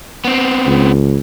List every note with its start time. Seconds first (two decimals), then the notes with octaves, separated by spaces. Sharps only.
0.25 B3 C4
0.66 C#2